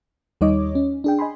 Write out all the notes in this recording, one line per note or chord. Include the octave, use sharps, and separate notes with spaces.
D#2 G3 D#4 C#5 D#5 D6
C#4
D4 G#4 G5
D#5 G#5 B5 C6